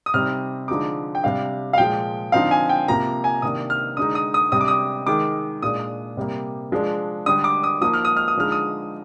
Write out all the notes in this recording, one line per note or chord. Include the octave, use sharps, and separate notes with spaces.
D#6
C3 G3 C4 D#4 F6
D3 F3 G#3 D#4 D6
G5
C3 G3 D4 F5
F5
A#2 F3 G#3 G5
D3 F3 C4 D#4 F5
G#5
G5
C3 F3 A#3 A#5
G#5
C3 D#3 A#3 D4 D#6
F6
D3 G#3 D#4 D#6
D#6
D#6
C3 G3 D4 D#6
D6
D#6
D#3 G#3 D#4 D6
A#2 G#3 D4 D#6
C3 G3 A#3
F3 G#3 D4
D3 G3 D4 D#6
D6
D#6
F3 A#3 D#4 D#6
F6
D#6
F6
D#6
D3 F3 G#3 D#4 F6
D#6